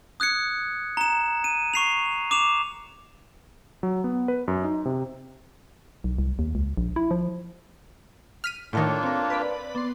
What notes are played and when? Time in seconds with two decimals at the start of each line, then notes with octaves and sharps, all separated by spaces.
0.20 D#6 F#6 G#6 C#7
0.97 A#5 E7
1.44 D#7
1.74 C#6 C7 F7
2.31 D6 E7 F7
3.83 F#3
4.04 B3
4.28 B4
4.48 F#2
4.64 D#4
4.85 C3
6.04 B1
6.18 C2
6.39 D#2
6.55 C#2
6.77 A#1
6.96 E4
7.11 F3
8.44 F6 B6 D#7
8.73 A2 D#3 A#3 D4 F4 A4 C#5 G5
9.03 C4 A#4
9.30 B4 D5 B5
9.75 B3 D5 C6